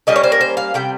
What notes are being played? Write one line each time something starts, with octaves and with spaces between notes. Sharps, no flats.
G3 A#3 C#4 D#5
C#5
C5
A#4
C5
F5
C3 G3 G5